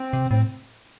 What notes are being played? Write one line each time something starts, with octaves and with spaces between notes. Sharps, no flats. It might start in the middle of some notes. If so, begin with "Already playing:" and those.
Already playing: C4
C3
A2 C4